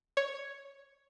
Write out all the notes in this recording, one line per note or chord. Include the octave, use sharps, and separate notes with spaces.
C#5